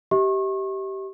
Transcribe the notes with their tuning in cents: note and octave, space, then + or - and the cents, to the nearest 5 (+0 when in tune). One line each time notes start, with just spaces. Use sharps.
G4 -15 E5 -45 C#6 -35